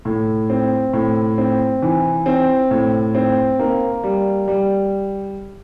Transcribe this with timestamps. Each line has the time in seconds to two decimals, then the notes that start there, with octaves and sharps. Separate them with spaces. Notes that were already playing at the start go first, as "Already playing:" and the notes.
0.05 A2
0.50 C4
0.93 A2
1.38 C4
1.82 E3
2.26 C4
2.71 A2
3.15 C4
3.59 A#3
4.03 G3
4.48 G3